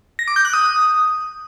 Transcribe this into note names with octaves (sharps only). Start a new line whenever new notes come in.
A#6
D6
G6
F#6
D#6